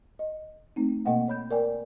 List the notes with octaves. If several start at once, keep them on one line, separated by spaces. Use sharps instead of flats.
D#5
A3 C4 D#4
B2 A#3 D#5 F#5 G5
C#5 B5 G6
A#4 D5 G5 G#5